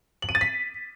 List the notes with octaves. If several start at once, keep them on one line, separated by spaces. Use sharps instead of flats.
F#7
D#7
A6
B6